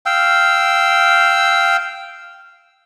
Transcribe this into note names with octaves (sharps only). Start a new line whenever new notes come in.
F5 G5 E6